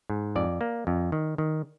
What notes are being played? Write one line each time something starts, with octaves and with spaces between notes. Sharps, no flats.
G#2
F2 D5
A#3
F2
D#3
D#3